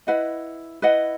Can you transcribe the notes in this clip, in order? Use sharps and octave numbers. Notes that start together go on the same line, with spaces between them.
E4 B4 D#5 F#5
E4 B4 D#5 F#5